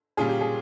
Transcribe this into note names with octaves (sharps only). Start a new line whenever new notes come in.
A#2 G3 C#4 F4 G#4
G4
G#4